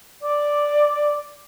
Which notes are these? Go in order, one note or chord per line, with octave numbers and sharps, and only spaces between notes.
D5 D6